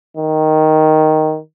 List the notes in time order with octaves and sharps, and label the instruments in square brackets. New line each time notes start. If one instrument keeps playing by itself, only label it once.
[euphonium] D#3